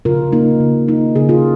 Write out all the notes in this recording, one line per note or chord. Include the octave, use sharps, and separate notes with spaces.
C#3 F4 A#4
A#3 D#4
C#3
A#3 D#4
C#3 G#4
F4